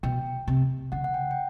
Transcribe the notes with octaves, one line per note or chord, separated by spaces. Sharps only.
B2 G5
C3
C#3 F#5
F#5
G5
G5